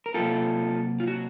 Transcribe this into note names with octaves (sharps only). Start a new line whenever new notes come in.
A#4
C3 F#3 A#3 F4 A4
F4
F#4